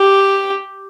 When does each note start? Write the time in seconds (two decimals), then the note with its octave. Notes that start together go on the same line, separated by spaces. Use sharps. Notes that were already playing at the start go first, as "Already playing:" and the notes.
Already playing: G4